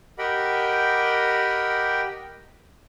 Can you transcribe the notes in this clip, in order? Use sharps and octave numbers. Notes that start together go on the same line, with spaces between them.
G4 A#4 D#5 F#5 G5 B5